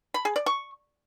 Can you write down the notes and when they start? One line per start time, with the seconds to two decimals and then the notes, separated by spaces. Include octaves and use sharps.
0.14 B5
0.25 G#4
0.36 D5
0.46 C#6